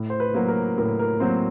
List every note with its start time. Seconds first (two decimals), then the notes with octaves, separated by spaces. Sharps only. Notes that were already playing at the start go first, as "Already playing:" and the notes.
Already playing: A2
0.10 C5
0.20 B4
0.34 F#3 A#3
0.48 A#4
0.78 A2 A#4
0.99 A#4
1.20 F#3 A#3 C4 C5